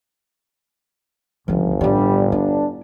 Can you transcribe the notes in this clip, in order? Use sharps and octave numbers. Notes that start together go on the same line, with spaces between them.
G1 C#2 F3
A1 G3 D4
D4 E4